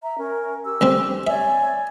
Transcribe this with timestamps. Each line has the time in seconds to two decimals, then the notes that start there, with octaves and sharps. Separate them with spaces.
0.03 E5 A#5
0.18 C#4 A#4
0.65 G4 E6
0.81 D2 G3 C4
1.27 C#5 D5 E5 G#5